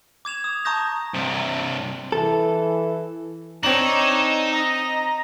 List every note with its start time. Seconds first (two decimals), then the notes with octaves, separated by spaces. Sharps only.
0.25 D6 G#6 E7 F7
0.44 D#6
0.65 A5 A#5 C#6 D#6 G6 A#6
1.14 G2 C3
2.12 E3 A4
3.63 C4 D4 D#4 C#5 E7 F#7
4.52 D#5 A#5